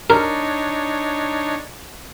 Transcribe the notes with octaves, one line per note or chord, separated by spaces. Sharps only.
D4 D#4 A#4 C#5